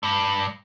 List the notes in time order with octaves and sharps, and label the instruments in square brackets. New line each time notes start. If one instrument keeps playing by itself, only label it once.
[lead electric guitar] G2